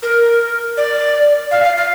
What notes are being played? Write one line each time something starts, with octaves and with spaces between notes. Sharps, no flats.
A#4
D5
F5
F5
F5